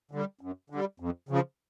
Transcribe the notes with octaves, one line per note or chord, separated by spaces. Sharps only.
D3 G3
F#2
D3
G3
F2
C#3 F3